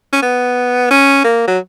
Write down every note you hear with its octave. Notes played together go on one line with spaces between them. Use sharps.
C#4
B3
C#4
A#3
F#3